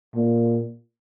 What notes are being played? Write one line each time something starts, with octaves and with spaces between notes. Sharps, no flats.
A#2